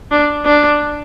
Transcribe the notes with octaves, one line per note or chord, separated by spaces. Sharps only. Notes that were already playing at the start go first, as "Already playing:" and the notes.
D4
D4